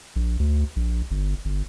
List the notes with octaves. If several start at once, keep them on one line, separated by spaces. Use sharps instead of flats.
A#1
D2
A#1
G1
G1